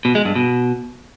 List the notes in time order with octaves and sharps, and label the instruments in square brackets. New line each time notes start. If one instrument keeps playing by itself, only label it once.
[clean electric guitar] B2
G#3
G2
B2